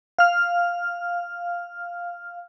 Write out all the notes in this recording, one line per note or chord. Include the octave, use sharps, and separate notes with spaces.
F5 F6